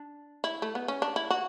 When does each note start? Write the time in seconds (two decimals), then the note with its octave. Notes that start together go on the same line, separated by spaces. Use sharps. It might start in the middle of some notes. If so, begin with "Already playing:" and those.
Already playing: D4
0.44 E4
0.62 A3
0.75 B3
0.88 C#4
1.02 D4
1.16 E4
1.30 F#4